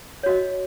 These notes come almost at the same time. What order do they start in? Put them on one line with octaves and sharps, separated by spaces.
C#5 F#4 D#5